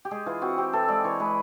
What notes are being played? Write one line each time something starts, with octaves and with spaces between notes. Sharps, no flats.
G4
G#3 G#4
E3 F4
C4 F#4
C4 G4
E3 A4
G#3 D5
E3 C#5
G#3 B4